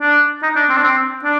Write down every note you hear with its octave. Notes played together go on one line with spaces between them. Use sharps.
D4
D#4
D4
C4
D4
C4
D4